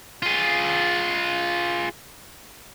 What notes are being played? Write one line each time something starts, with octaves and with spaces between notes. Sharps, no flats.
F4 G#4